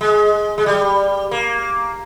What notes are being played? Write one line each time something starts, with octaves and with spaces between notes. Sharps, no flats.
G#3
G#3
G3
A#3